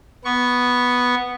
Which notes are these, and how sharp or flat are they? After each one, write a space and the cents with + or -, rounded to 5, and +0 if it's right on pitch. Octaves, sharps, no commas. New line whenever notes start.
B3 +0 C#6 +0